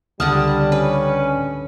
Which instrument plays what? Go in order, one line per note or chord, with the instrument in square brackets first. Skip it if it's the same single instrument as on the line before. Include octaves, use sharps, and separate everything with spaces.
[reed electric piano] C#2 D#6 F6 [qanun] D3 F#5 A5 [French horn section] G3
[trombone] C#4 [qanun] B4